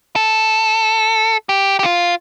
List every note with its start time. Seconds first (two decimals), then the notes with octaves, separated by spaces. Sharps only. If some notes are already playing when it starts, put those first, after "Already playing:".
0.16 A4
1.49 G4
1.79 G4
1.83 F4